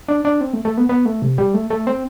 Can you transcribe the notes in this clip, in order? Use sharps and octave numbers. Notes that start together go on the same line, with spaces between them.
D4
D4
C4
A3
A3
B3
B3
A3
C3
G3
A3
A3
C4